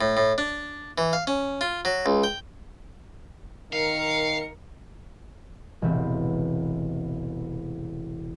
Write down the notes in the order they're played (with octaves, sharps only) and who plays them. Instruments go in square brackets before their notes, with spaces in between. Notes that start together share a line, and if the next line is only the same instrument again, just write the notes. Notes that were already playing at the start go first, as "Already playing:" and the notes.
[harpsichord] A2
A2
D4
E3
F5
C#4
F4
F#3
C#2
G5
[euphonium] D#3 [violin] A#4 C#7 [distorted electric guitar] F5
[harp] E1 A1 C3 B3 C4 B5